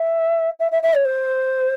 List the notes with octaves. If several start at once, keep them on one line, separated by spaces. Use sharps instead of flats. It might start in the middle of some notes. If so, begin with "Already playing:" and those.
Already playing: E5
E5
E5
E5
C#5
C5